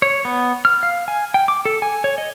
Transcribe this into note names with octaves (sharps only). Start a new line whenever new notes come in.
C#5
B3
F6
F5
G#5
G5
D6
A4
G#5
C#5
D#5